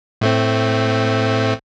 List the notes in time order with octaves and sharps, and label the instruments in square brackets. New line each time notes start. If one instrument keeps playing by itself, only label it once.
[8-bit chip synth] A2 A3 C4